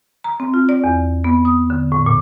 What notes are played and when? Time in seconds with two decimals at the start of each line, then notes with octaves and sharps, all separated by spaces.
0.24 A#5
0.40 C4
0.54 F4
0.69 D5
0.84 E2
1.24 B3
1.45 D#6
1.70 D3
1.92 A2
2.06 A#2